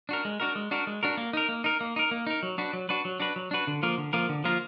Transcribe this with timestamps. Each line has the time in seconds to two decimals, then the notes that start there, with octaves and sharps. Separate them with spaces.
0.09 D4 F#4 A#4
0.25 G#3
0.40 D4 F#4 A#4
0.56 G#3
0.71 D4 F#4 A#4
0.87 G#3
1.03 D4 F#4 A#4
1.17 A#3
1.33 D#4 A#4
1.49 A#3
1.64 D#4 A#4
1.81 A#3
1.96 D#4 A#4
2.11 A#3
2.27 D#4 A#4
2.43 F#3
2.58 D4 F#4 B4
2.73 F#3
2.89 D4 F#4 B4
3.05 F#3
3.20 D4 F#4 B4
3.36 F#3
3.51 D4 F#4 B4
3.67 D3
3.82 F3 A#3 F4 A#4
3.98 D3
4.13 F3 A#3 F4 A#4
4.29 D3
4.44 F3 A#3 F4 A#4